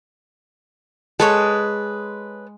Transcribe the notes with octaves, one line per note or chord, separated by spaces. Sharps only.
G#3 A4 B4 C#5